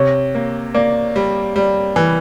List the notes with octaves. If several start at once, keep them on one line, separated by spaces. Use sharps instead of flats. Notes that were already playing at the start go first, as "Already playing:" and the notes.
Already playing: C3 C#5
A#3
A#3 D5
G3
G3
E3